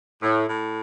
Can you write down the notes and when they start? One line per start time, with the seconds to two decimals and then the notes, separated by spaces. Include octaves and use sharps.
0.23 A2
0.48 A2